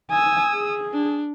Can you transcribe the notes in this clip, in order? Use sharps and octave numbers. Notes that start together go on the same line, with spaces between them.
G#5 D#6 E6
G#4
D4